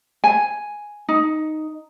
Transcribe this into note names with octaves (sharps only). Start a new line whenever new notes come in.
G#5
D#4